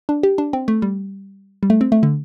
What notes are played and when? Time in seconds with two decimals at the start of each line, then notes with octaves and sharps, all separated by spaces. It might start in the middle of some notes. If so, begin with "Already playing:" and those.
0.09 D4
0.23 G4
0.38 D4
0.53 C4
0.68 A3
0.82 G3
1.63 G3
1.70 A3
1.81 C4
1.92 A3
2.03 D3